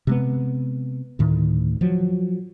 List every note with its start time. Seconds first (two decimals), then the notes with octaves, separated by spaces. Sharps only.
0.07 C3 G#3 B3
1.19 D2 A2 D#3
1.81 F3 F#3